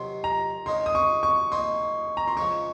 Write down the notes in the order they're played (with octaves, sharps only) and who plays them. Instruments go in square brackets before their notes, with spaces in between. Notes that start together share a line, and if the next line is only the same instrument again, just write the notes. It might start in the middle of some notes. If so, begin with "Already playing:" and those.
Already playing: [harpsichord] C3 D#3 F#3 [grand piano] C6
[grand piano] A#5
[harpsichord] C#3 G#3 D#4 A#4 C#5 [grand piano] C6
[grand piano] D#6
C#6
C#6
[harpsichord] A#3 D#4 G#4 C5 D#5 [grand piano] C6
[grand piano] A#5
C6
[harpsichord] C#3 F3 G#3 C#4 [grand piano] C#6